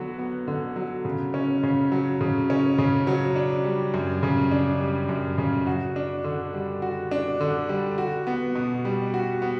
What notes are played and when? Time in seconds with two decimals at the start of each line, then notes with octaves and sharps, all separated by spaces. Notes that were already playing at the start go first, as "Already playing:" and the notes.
Already playing: D3 F#3 B3 F#4
0.19 B3
0.48 D3
0.76 F#3
1.05 C#3
1.34 C#4
1.63 C#3
1.92 F#3
2.21 C#3
2.50 C#4
2.78 C#3
3.07 F#3
3.36 D4
3.64 G3
3.94 F#2
4.23 C#3
4.51 D4
4.81 G3
5.09 F#2
5.38 C#3
5.67 F#4
5.96 D4
6.24 D3
6.54 G3
6.82 F#4
7.11 D4
7.41 D3
7.69 G3
7.98 F#4
8.27 B3
8.55 B2
8.85 G3
9.14 F#4
9.42 B3